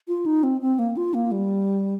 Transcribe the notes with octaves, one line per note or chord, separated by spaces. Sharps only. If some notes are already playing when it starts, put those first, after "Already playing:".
F4
D#4
C4
C4
A#3
F4
A#3
G3